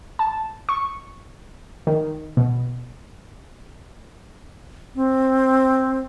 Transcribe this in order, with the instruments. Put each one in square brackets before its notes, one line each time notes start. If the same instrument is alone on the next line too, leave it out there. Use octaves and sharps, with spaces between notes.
[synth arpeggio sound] A5
C#6
D#3
B2
[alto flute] C4